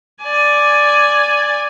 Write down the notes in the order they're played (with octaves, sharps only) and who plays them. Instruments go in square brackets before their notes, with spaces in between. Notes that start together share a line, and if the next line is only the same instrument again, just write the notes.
[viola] D5 G#5